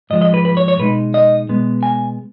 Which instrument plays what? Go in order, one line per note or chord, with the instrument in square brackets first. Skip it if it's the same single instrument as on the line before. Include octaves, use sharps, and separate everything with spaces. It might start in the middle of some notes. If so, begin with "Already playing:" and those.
[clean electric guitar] G#2 F3 G#3 D#5
D#5
B4
B4
C#5
C#5
B2 G#3 D#4 B4
D#5
B2 G#3 B3
G#5